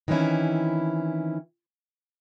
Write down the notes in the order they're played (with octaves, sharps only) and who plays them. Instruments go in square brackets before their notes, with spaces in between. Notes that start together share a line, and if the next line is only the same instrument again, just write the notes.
[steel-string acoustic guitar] D#3 E3 C4 C#4 E4